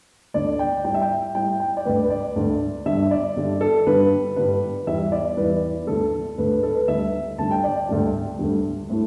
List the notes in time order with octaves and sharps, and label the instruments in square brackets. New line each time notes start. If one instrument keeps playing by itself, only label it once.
[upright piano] D2 D3 A3 D5
G5
A2 G3 G5
E5
G5
A2 G3 G5
G5
D5
D2 D3 A3 B4
B4
D5
D2 D3 A3
G2 D3 G3 E5
D5
G2 D3 G3
A4
G2 D3 G3 B4
G2 D3 G3 B4
E2 E3 G3 E5
D5
E2 E3 G3 B4
D2 D3 A3 A4
D2 D3 A3 B4
B4
A4
B4
D2 D3 G3 E5
D2 D3 G3 A5
G5
D5
D2 D3 G3
D2 D3 G3
A2 A3